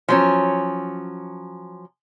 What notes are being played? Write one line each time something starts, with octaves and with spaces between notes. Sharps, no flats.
F3 F#3 C#4